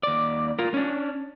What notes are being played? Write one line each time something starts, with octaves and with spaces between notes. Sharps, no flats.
D#2 D5
F4 A#4
C#4 D4